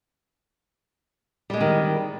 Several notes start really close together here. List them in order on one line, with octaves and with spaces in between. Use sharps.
G3 G#3 C4 D#3